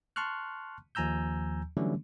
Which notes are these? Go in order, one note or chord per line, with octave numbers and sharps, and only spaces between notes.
A5 C6 C#6 F6 F#6
D#2 F3 G#5 A#5 E6 G6
D3 E3 F#3 G3 A3 C#4